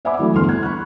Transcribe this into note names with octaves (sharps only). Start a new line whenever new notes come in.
D5 E5 F#5 G#5 B5 D6
E3 F#3 A3 C4 F#4
E2 G2 D3 A4 C6 F6
F#6 G#6
B5 C#6 F#6